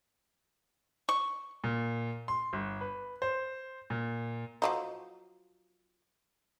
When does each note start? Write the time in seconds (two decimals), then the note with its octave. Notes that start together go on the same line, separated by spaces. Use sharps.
1.09 C#6
1.64 A#2
2.28 C6
2.53 G1
2.81 B4
3.22 C5
3.90 A#2
4.62 F3 F#3 D#4